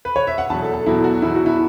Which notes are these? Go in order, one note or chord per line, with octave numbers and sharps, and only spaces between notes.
B4
C#5
E5
F#5
E2 B2 F#3 A5
A4
A4
E2 B2 F#3 E4
F#4
E2 B2 F#3 E4
F#4
E4